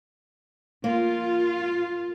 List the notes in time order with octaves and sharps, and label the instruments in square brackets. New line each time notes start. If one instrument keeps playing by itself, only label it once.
[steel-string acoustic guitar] A#3 [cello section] F4